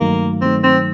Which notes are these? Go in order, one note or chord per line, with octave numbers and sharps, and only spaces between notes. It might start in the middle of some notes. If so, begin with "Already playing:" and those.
G2 D#3 F#3 A3 A#3 D#4
G2 D#3 F#3 A3 C4 D#4
C4